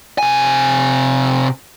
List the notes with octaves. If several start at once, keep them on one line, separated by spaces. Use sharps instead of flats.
C3 G#5